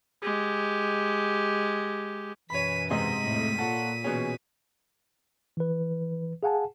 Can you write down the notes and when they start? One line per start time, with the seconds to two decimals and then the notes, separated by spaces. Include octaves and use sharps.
0.22 G#3 G4
2.50 F#2 B2 E3 C#5 B5 B6 D#7
2.90 G#2 C3 D#5 B6 D#7
3.25 F2 A2
3.59 A#2 F4 A4 C#5 F#5
4.04 B2 E3 A#3 C#4 G#4
5.57 E3 B4
6.43 G#4 F5 F#5 G#5 A5